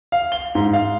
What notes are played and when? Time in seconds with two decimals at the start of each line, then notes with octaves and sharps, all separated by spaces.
0.12 F5
0.32 G7
0.55 G#2
0.73 F5